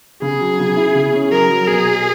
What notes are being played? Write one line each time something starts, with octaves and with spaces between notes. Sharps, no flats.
C#3 G#4
F#3
C#3
E4
C#3
C#4
F#3 A#4
F#3
B2 G#4
B2